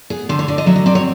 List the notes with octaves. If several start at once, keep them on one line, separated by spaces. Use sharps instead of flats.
B3 G#4
D3 C5
C#5
D3 D5
D#5
F#3 E5
D#5
C4 D5
C#5